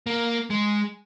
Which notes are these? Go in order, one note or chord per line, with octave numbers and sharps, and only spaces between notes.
A#3
G#3